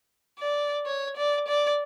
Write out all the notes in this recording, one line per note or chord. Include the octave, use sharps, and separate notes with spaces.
D5
C#5
D5
D5